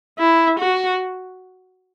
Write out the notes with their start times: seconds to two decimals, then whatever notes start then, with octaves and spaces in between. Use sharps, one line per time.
0.19 E4
0.59 F#4